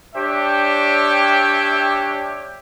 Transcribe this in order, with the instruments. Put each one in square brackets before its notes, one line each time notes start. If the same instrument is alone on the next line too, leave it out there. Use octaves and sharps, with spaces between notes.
[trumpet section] D4 G4 C#5 E5 G5